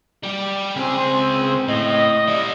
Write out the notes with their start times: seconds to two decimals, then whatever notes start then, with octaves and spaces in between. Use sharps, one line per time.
0.23 G3 G4
0.76 C#2 C4 G#4
1.68 A2 D#5
2.28 G3 E4 D5